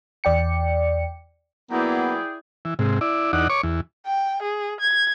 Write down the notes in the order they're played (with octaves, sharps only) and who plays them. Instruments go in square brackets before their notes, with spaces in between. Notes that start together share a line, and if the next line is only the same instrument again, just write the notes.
[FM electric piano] E2 D5 G5 C#7
[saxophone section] F#3 A#3 B4 [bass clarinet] B3 [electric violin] E4 D5 [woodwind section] G#4 G5
[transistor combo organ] E3
G#2 C3
E4 D5
E2 D#4 D5 F#5
C#5 C#6 D6
E2
[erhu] G5
G#4
G#6